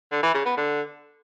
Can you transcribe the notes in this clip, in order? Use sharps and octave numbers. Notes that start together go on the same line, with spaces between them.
D3
E3
C#3
B3
D3